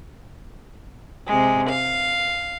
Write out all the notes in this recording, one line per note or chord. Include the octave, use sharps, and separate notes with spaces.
C3 G#3
F5